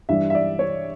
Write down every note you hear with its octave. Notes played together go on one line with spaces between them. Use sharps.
G2 E3 G3 D4 E5
E5
D5
C#5